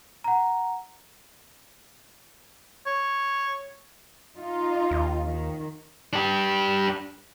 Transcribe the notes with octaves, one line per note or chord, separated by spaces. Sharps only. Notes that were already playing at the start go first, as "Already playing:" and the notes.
F#5 A#5
C#5
D#4 F4
D#2
D#3
D4 G4